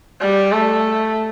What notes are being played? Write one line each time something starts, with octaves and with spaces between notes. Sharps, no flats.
G3
A3